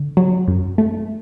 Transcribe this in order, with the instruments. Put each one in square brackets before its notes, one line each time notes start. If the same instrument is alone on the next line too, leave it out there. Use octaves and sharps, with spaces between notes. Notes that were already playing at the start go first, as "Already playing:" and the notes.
Already playing: [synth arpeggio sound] D3
F#3
F#2
A3